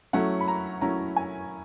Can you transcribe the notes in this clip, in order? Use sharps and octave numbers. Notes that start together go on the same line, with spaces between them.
F#3 A3 C#4 E4 F#5
B5
A#5
F#3 A3 C#4 E4 A#5
G#5